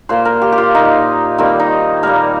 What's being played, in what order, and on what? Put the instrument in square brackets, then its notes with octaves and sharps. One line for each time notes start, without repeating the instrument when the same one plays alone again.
[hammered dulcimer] A#2 A#3 C5
A#4
G4
G4
F4
A#2 A#3 D#4
D#3 G3 A#3 C4
D#4
A#2 G3 A#3 A#4